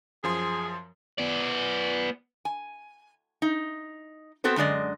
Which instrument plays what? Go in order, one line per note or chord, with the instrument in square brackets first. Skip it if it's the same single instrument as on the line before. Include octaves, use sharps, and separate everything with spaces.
[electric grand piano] F#2 F3 C6 [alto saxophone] G#4
[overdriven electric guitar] B3 D5
[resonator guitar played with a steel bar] G#5
D#4
B3 C4 F#4 A4 C5
F#2 D3 G#3 D5 D#5